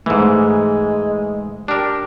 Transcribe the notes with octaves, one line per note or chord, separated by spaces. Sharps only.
G#2 E3 G#3 A3
D4 G4 A#4